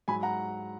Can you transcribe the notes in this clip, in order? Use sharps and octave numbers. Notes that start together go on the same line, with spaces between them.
G#2 F#3 G#5 B5
F#5 A#5